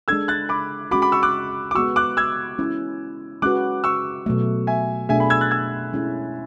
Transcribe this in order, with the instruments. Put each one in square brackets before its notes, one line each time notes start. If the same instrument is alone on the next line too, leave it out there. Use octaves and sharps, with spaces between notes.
[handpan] G#3 D4 A4 [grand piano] E6 G#6
[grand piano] F#6 A6
B5 D6
[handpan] G#3 C#4 F#4 [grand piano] B5 D6
[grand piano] B5 D6
C#6 E6
D6 F#6
D6
[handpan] G#3 B3 F#4 [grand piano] C#6 E6
[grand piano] D6 F#6
E6 G#6
[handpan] G#3 C#4 E4
[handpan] G#3 C#4 F#4 B4 [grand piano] D6 F#6
[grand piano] C#6 E6
[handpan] B2 F#3 A3
[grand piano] E5 G#5
[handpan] B2 A3 D4 G#4 [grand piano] E5 G#5
[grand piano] G#5 B5
E6 G#6
F#6 A6
E6 G#6
[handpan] G#3 C#4 E4